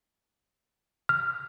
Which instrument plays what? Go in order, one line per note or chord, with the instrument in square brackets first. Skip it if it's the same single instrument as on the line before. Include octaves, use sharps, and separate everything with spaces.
[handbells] F6